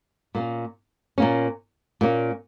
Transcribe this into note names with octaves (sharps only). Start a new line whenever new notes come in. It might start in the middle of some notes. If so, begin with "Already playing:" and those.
A#2 A#3 C#4
A#2 A#3 C#4
A#2 A#3 C#4